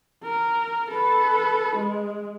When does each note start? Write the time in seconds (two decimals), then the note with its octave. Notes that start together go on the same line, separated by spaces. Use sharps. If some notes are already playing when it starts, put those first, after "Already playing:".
0.24 A#4
0.90 A4 B4
1.76 G#3